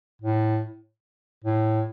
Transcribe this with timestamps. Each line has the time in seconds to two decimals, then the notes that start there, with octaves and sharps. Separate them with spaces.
0.22 A2
1.44 A2